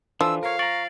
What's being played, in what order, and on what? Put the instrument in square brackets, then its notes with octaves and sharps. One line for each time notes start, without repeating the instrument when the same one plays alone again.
[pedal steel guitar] E3 D4 [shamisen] F3 [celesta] A4 [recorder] E6
[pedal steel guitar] A#4 C#5 [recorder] F5
[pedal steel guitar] A#5 C#6 [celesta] A6 D7 F#7